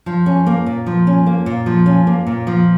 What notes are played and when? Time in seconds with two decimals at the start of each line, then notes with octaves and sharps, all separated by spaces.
0.06 F3
0.26 C#4
0.46 A#3
0.66 A#2
0.86 F3
1.07 C#4
1.26 A#3
1.46 A#2
1.66 F3
1.86 C#4
2.07 A#3
2.27 A#2
2.47 F3